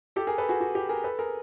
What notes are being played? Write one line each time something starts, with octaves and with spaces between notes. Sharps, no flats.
G4 A4
G#4 A#4
A4 B4
F#4 G#4
F#4
G4
G#4 A#4
A4 B4
G#4 A#4